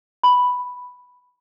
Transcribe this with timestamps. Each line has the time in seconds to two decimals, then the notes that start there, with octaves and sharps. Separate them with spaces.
0.23 B5